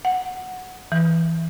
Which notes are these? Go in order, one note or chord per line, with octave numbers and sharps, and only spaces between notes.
F#5
E3